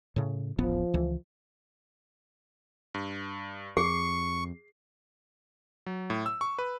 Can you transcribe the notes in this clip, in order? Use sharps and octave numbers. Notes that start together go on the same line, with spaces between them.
A2 C#3
D1 A1 F3 B3
C#2 E3
G2
F2 G#4 C#6 C7
F#3
A2
E6
C#6
B4